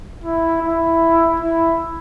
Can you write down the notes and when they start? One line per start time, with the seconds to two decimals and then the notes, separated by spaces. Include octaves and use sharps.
0.24 E4
0.63 E4
1.40 E4